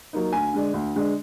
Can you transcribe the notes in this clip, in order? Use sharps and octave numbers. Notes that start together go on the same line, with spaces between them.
F#3 A#3 D#4
D2 G#5
D3 G#3 D4
D2
D3 G#3 D4